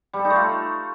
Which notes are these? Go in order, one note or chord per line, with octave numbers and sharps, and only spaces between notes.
G3
A4
D#4
A3
F4